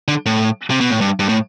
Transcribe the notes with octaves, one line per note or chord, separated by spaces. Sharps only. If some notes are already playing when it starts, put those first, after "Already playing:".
D3
A2
C3
B2
A2
G2
G2
A2